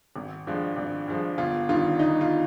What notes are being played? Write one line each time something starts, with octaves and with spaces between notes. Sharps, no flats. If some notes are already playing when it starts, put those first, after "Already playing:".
G#1
G2 F3 G#3
G#1
G2 F3 G#3
G1 F4
G2 D#3 F4
G1 D#4
F4